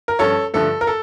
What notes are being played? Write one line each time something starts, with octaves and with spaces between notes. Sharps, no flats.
A#4
G2 F3 C#4 A4 C#5
G2 D3 F3 A3 A4
A#4
A4